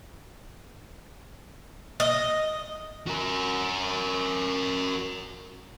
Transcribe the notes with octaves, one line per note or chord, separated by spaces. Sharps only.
D#5
F#4 A#4